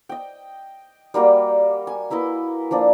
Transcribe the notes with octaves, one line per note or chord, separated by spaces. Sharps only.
D#5 G5
G3 A#3 F#4 G5
G#5
A#3 E4 B4 D#5
F3 A#3 D4